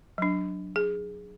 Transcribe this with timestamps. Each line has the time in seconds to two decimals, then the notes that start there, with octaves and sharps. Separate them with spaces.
0.18 F#3 D4
0.76 G#4